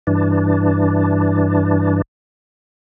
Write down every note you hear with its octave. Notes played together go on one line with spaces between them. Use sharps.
G2 E3 D4